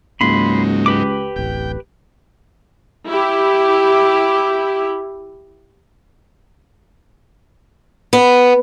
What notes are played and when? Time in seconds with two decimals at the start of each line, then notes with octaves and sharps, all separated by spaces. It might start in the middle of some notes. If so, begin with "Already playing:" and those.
0.21 C#2 G#2 F#3 A#3 D#4 B5 C6
0.86 G4 B4 D6
1.36 D1 A1 G5
3.09 E4 G4
8.13 B3